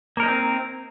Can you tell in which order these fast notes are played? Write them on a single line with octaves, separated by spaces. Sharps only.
A#3 A#4 D#4 C#4 C4